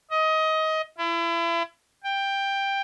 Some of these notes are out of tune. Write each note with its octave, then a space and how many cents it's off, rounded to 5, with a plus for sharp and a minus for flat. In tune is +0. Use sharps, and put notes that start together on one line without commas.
D#5 +20
E4 +35
G5 +10